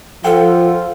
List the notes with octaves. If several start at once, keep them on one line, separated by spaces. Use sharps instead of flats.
F3 F4 A4 F#5 G5